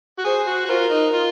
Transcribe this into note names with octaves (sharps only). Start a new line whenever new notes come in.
F#4
G#4 C5
F#4
F#4
F4 A#4
D#4
F4